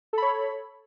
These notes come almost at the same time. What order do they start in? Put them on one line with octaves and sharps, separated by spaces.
A4 B5 C#5